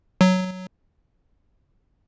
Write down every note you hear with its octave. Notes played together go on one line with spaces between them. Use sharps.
F#3